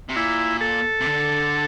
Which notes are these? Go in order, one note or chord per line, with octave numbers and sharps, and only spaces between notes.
C3
A#2 E4
A4
C3
D3